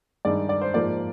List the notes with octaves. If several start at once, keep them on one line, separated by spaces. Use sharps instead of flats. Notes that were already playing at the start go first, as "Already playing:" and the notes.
G2 D#3 G#3 D5
D5
C5
G#2 F3 A#3 D5